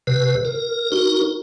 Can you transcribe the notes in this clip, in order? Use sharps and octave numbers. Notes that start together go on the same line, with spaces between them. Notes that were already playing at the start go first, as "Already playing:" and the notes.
C3 B4
A#4
D#4 F#4 A#4